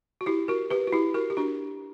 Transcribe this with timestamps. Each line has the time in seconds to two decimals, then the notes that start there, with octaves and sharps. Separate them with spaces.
0.21 F#4
0.26 E4 G4
0.48 F#4 A#4
0.70 G4 B4
0.87 F#4
0.93 E4 G4
1.14 F#4 A#4
1.30 G4
1.37 D4 F#4